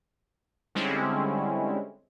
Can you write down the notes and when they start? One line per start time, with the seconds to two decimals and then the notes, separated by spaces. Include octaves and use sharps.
0.75 D3 G3 G#3 C4 C#4 E4